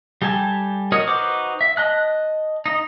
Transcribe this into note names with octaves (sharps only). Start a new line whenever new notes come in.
G3 G4 A4 G#5 A5
F#4 A#4 C#5 D#5
D#4 F#4 B4 C5 D6
E5
D#5 A5 F#6
D#4 D#5